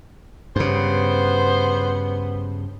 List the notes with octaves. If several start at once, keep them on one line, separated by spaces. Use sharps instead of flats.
G2 C#3 B3 C5